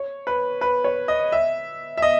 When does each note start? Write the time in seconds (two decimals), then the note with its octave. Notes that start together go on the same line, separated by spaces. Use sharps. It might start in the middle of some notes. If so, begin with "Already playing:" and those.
Already playing: C#5
0.27 B4
0.61 B4
0.84 C#5
1.08 D#5
1.32 E5
1.97 E5
2.02 D#5